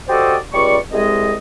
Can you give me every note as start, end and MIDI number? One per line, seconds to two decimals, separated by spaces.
0.08 0.36 66
0.08 0.36 67
0.08 0.36 69
0.08 0.36 72
0.08 0.36 74
0.08 0.36 75
0.53 0.77 37
0.53 0.77 55
0.53 0.77 74
0.53 0.77 85
0.92 1.34 36
0.92 1.34 48
0.92 1.34 56
0.92 1.34 68
0.92 1.34 75